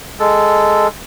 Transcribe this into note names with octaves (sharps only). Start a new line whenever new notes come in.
G#3 A4